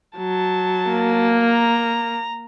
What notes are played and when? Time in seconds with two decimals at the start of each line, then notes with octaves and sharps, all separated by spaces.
0.17 F#3 A5
0.90 A#3
1.44 A#5